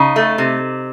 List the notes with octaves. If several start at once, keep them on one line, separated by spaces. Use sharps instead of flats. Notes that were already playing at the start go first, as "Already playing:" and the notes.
Already playing: C#3 D#4
A3
C3